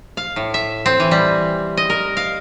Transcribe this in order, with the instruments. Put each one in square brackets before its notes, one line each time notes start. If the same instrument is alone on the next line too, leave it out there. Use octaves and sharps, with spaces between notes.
[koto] F5
A2
E5
C4
E3
G3
D#5
A#4
F5